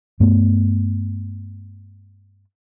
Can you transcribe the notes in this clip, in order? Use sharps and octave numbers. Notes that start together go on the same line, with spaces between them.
G2 A3 B3